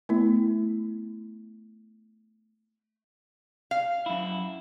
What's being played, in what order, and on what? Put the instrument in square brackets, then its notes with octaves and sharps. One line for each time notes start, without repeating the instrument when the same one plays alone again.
[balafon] A3 B3 E4
[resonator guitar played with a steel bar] F5
[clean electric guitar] F#2 E4